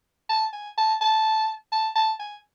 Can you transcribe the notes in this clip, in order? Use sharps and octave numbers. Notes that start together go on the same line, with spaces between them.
A5
G#5
A5
A5
A5
A5
G#5